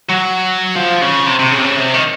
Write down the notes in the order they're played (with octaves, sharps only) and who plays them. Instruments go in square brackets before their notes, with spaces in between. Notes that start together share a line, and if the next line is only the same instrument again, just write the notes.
[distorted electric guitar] F#3
F3
C#3
C3
C3
C#3
C3
C#3
C3
D#3